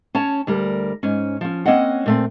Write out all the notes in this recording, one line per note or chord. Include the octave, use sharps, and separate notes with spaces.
C#4 C#5 A5
D2 G3 A#4
G#2 C#4
F3 C#4
A#3 C4 C#4 D#5 F#5
A#2 A3 C4